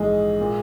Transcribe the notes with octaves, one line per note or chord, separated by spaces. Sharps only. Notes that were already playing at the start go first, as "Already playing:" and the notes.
Already playing: A#1 G#2 E3 G#3
A#2